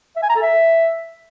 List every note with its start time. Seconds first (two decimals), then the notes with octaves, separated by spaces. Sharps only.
0.16 E5
0.23 G#5
0.29 A#5
0.36 A4
0.42 E5